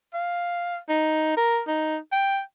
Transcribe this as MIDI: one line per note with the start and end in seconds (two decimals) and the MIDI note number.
0.14 0.77 77
0.89 1.36 63
1.37 1.60 70
1.68 1.97 63
2.12 2.40 79